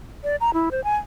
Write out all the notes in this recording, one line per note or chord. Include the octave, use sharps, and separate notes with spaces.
D5
A#5
E4
C5
G#5